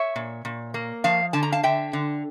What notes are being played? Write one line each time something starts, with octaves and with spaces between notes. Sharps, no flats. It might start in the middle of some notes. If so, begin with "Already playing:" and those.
Already playing: C#5 E5
A#2
A#2
A#3
F3 F5 A5
D3 A5
A#5
F5 A5
D3 E5 G5
D3